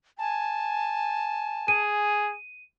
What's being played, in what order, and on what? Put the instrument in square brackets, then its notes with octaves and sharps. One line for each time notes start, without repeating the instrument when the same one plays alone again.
[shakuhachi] G#5 [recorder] A5
[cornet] G#4 [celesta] D#7